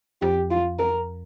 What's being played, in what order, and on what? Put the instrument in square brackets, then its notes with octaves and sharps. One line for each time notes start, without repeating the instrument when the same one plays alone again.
[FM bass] F2 [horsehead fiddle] G4
[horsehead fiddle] F4
A#4